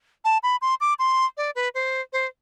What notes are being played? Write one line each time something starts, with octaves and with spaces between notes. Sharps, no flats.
A5
B5
C6
D6
C6
D5
B4
C5
C5